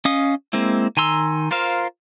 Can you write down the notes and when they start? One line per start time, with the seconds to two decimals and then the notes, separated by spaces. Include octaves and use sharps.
0.05 C#4 D#5 F5 D#6
0.53 G#3 A#3 C4 E4
0.97 D#3 G#5 A#5 C6 E6
1.51 F4 A#4 C5 F5